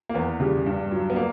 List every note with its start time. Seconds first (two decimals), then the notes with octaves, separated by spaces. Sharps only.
0.09 A#3
0.14 E2 B3
0.40 C#3 G3
0.66 G2
0.91 F#3
1.10 B3
1.16 A#3